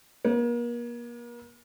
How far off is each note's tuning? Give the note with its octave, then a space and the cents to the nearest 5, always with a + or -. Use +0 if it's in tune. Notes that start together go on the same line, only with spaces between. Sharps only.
A#3 +40